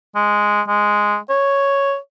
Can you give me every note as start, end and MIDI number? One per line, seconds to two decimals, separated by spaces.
0.15 0.62 56
0.68 1.17 56
1.30 1.96 73